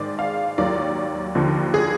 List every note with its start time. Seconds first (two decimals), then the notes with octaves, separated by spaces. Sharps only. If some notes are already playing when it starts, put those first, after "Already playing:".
Already playing: G#2 D#3 G#3 D5
0.19 F5
0.58 D#2 D#3 F#3 D5
1.35 D#2 D3 F3
1.74 G#4